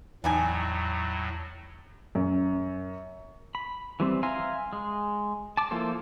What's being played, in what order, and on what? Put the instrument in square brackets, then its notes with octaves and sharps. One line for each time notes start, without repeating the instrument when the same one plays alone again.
[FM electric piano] E2 A5 [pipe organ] A2 F#3 [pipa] G3 D#4 G#5
[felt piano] F#2
[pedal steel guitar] B5
E3 G3 C4
E5 F5 G#5 A#5 C6
G#3
A5 D6
F3 A#3 E4 A4 C5